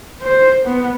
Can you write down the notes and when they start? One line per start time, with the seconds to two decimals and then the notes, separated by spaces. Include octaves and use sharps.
0.21 C5
0.65 B3